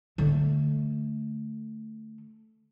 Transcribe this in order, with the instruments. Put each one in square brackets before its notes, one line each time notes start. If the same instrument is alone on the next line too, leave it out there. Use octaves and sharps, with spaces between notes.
[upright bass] D3 A3